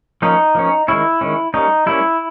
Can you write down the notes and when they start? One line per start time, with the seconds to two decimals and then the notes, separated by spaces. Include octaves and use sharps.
0.22 F3 A#3 C#4 D#4
0.55 F3 A#3 C#4
0.88 D#3 G#3 C#4 E4
1.21 D#3 G#3 C#4
1.54 G3 A#3 C#4 D#4
1.86 G3 A#3 C#4 E4